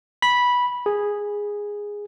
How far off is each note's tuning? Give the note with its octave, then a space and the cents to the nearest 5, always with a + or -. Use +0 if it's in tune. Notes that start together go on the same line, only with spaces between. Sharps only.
B5 -10
G#4 -10